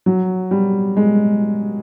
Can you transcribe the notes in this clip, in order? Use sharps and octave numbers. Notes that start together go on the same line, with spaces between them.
F#3
G3
G#3